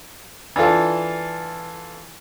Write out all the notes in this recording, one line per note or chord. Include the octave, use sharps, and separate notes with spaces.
E3 D4 F4 A4